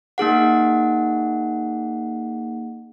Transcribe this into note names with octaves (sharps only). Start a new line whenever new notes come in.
A#3 D#4 G#4 F#5